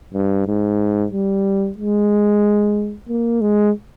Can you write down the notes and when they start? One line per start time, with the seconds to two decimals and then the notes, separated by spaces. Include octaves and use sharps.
0.14 G2
0.47 G#2
1.12 G3
1.78 G#3
3.09 A#3
3.41 G#3